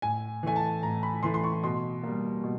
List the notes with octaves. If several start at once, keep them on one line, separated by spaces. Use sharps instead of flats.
A2 G#5
E3 A3 G#5
A5
A2 A#5
B5
E3 A3 C6
C6
C#6
B2 C6
G3 A#3
B2